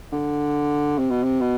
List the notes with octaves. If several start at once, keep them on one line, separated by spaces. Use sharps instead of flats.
D3
C3
B2
C3
B2